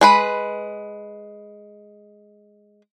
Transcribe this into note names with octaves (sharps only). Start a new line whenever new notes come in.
G#3 B4 B5